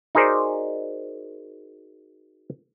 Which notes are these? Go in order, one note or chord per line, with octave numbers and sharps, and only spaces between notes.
D#4 F#4 G#4 A#4 C5 D5